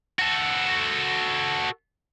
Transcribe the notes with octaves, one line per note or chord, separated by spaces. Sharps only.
F#4 A4